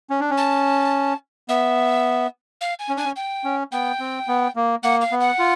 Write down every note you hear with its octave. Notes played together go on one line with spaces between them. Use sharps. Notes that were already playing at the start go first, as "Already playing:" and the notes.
C#4
D4
C#4
A5
B3 E5
F5
G#5
C#4
D4 G#5
C#4
G5
C#4
B3 G5
C4
B3
A#3
A#3 F#5
F5
B3
F#5
F4